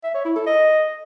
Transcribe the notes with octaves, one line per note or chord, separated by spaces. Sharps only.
E5
C#5
E4
A4
D#5